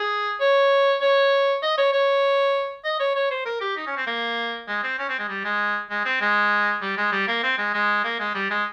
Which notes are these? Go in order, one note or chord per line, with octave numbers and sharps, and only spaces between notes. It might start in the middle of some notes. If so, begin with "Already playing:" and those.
Already playing: G#4
C#5
C#5
D#5
C#5
C#5
D#5
C#5
C#5
C5
A#4
G4
D#4
C#4
C4
A#3
G#3
C4
C#4
C4
G#3
G3
G#3
G#3
C4
G#3
G3
G#3
G3
A#3
C4
G#3
G#3
A#3
G#3
G3
G#3